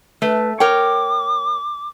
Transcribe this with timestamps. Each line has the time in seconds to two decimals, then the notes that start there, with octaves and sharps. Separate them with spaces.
0.22 A3 B4
0.60 A#4 C#5 G5 D6